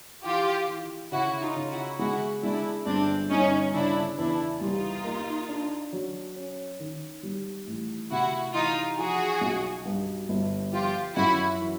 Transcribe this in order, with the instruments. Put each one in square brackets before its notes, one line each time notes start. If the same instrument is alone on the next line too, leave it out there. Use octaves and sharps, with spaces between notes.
[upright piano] E3 [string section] F4 G4
[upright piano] E3
[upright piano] C#3 [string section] E4 F#4
[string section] D#4 F4
[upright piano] C#3
[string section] E4 F#4
[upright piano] G#3 [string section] E4 F#4
[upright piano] G#3 [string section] D4 E4
[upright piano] G1 [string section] C4 D4
[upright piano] G1 [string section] C#4 D#4
[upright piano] C#3 [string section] D4 E4
[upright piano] E2 [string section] D4 E4
[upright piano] C2 [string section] D#4 F4
[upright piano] A#3
D4
F#3
C#4
D#3
G3
A1
[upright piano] C3 [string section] E4 F#4
[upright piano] E3 [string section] D#4 F4
[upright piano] F3 [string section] F#4 G#4
[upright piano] B1
G2
G1
[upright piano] F3 [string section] F4 G4
[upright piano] F#2 [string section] E4 F#4
[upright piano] E3